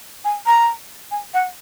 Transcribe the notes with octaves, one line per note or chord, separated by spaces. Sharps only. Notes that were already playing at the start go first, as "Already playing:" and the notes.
G#5
A#5
G#5
F#5